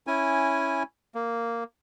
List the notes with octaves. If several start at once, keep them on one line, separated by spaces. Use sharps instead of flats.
C#4 E4 G#5
A#3